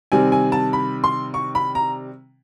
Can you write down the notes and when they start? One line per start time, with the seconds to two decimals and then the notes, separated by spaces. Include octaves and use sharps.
0.12 C3 D#3 G3 C4 G#5
0.32 G#5
0.52 A5
0.73 B5
1.04 C6
1.34 C#6
1.55 B5
1.75 A#5